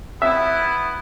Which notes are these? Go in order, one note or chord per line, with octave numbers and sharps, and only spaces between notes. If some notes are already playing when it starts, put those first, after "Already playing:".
B3 E4 E5